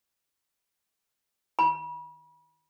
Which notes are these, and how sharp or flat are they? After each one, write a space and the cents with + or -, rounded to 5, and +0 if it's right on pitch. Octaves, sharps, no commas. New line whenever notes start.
B5 -35